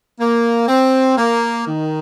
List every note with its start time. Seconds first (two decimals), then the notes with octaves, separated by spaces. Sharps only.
0.19 A#3
0.68 C4
1.17 A#3
1.66 D#3